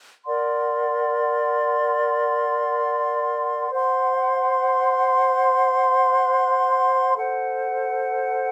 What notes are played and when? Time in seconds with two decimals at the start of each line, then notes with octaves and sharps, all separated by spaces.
0.24 A#4 D5 F#5 C6
3.70 C5 F#5 C6
7.16 A4 C5 F#5